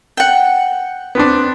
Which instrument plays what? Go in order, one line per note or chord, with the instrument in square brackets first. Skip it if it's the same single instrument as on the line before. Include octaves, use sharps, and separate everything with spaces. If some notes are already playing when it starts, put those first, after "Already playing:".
[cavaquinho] F#5 G5
[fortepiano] B3 C4 D4